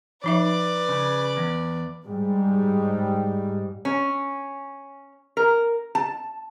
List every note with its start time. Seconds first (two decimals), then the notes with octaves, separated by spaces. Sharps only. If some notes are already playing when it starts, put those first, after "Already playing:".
0.24 F3 D#4 B4 D5 E5
0.89 C#3
1.37 E2
2.06 G#2 G3
3.85 C#4
5.37 A#4
5.95 A5